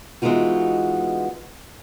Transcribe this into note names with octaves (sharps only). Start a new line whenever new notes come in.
E3 G#3 B3 D#4 F4 F#4